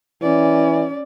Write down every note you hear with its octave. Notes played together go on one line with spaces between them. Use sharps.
E3 C#4 D5